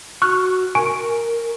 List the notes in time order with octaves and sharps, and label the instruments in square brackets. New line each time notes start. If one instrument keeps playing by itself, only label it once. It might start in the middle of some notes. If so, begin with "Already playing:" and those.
[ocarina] F#4 [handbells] C#6 F6 F#6
[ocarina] A#4 [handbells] G#5 C#6 D7